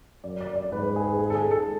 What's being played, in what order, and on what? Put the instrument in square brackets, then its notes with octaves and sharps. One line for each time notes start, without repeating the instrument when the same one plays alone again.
[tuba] F#2 [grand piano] D5
[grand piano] D5
D5
[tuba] G#2 [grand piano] B4
[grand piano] B4
G#4
G#4
G#4
A4
G#4
A4